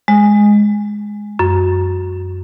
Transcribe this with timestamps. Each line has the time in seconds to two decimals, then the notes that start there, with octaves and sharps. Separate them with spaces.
0.08 G#3
1.39 F#2